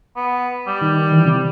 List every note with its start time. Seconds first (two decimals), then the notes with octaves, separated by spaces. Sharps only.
0.16 B3
0.67 G3
0.81 D#3
1.12 E3
1.26 C3